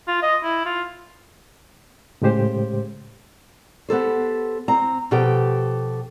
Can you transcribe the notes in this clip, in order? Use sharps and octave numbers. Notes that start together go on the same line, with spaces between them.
F4
D#5
E4
F4
A2 C#3 G#3 G4 C5
B3 G4 A4 C5
C4 A#5
B2 F3 G4 A4 G5